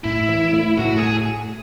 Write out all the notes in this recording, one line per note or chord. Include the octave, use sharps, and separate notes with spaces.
A2 E4
E3
A3
A2 F#4
G#4
A2